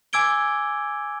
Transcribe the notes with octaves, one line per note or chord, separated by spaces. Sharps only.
G#5 D6 E6 G#6 D7 G7